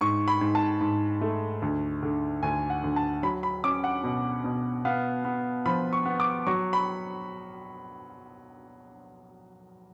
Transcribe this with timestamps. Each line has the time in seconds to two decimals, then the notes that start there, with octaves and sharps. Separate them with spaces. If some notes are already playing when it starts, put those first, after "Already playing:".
0.01 G#2 C#6
0.28 B5
0.41 G#2
0.55 A5
0.81 G#2
1.21 A3
1.62 D2
2.03 D3
2.43 D2 G#5
2.70 F#5
2.84 D2
2.96 A5
3.23 F#3 B5
3.43 B5
3.64 C#4 D6
3.84 F#5
4.04 B2
4.44 B2
4.85 B3 F5
5.25 B3
5.66 F3 B5
5.93 C#6
6.05 B3
6.20 D6
6.47 F#3 C#6
6.73 B5